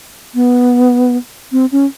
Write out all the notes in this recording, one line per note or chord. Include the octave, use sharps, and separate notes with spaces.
B3
C4
C#4